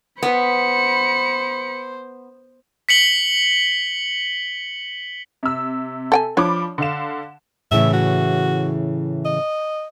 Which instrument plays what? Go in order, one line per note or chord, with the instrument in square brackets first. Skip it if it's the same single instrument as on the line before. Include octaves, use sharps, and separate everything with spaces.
[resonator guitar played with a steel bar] B3 [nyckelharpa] C5 [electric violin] B5 C#7
[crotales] B6 C#7 F#7 G7
[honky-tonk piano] C3 E6
[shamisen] A4 G5 G#5
[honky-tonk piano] F3 B5 D6 [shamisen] D4 C#5
[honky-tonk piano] D3 F5 E7
[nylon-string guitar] A2 C#3 E3 [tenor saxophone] E5
[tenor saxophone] F#4
D#5